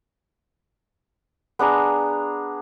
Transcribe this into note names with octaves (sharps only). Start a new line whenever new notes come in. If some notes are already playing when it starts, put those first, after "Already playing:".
B3 D4 G#4 A#5